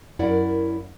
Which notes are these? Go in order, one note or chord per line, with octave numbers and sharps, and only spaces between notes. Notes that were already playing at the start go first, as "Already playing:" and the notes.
F#2 E4 A#4 D5 F#5